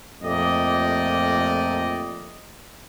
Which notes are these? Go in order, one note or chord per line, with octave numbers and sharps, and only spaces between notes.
F2 A#2 A3 G4 D5 D#5